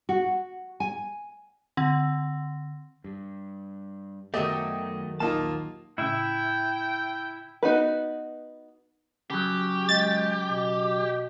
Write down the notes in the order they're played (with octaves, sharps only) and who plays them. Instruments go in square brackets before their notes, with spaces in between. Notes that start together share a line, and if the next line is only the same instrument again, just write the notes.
[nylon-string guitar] F#4
G#5
[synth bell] D3 C4
[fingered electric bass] G2
[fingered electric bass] F#2 B3 [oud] D#3 F#3 G4 [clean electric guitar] A3 [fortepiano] D#5
[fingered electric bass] A#1 [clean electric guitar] D#2 A5 [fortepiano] A#3 D#4 F4
[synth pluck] A2 C#3 [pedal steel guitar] E4 E5 [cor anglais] G5
[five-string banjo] B3 D#4 F#4 B4
[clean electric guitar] C#3 F#3 [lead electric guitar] G4
[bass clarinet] G#3 [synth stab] A6
[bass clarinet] B2